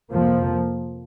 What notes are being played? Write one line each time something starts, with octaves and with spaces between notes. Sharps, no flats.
F2 C3 F3 A#3